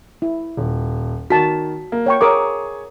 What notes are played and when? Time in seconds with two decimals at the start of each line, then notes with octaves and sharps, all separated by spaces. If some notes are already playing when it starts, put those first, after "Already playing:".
0.22 E4
0.57 D#1
1.30 D#3 F#4 A5 B6
1.92 A#3
2.06 C#5 G5 C#6
2.21 G#4 A#4 C#5 D6 D#6